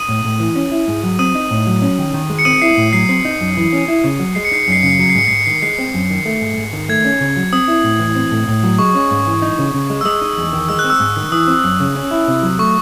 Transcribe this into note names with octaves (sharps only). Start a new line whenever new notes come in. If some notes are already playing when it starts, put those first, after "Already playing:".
Already playing: D#6 D#7
A2
A2
E3
C#4
E4
G#2
F#3
C4 D#6 D#7
D#4
A2
F#3
C#4
D#3
D#3
G#3
C#7
C4 D#6 D#7
E4 C7
A2
F#3 C7
C4 C7
D#4
F#2
E3
C#4
E4
C#3
F#3
G#3 C7
C#7
D#4 C7
C#7
F#2 C7
C#3 C#7
C7
F#3 C#7
C7
G#2 C#7
G#2 C7
C#7
D#3 C7
G#3 C7
C4
F#2
D#3
A3
G#2
G#2
D#3
A3 G#6
C#4
C#3
F#3
C4 D#6
E4
A2
E3
C4
A2
A2
F#3
G#3 C#6
C#4
G#2
E3
D#4
C#3
C#3
G#3
E6
G#3 D#6
D#4
E2
D#3
G#3 E6
F#6
C4
E6
G#2
D#3
E3 D#6
C4
F#2
C#3
C#4
E4
C3
F#3
A3 C#6